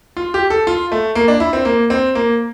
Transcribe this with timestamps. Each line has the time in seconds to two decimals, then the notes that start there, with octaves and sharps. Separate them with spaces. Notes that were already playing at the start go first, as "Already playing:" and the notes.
0.17 F4
0.34 G4
0.50 A4
0.67 F4
0.92 A3
1.15 A#3
1.28 D4
1.40 E4
1.53 C4
1.65 A#3
1.90 C4
2.15 A#3